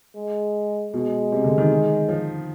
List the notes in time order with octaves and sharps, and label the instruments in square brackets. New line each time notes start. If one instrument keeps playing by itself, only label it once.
[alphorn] G#3
[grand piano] B2 [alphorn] G#3
[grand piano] C3
D3
D#3
F3